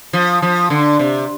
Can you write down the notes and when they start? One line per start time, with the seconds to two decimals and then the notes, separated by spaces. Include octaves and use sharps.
0.13 F3
0.42 F3
0.70 D3
0.99 C3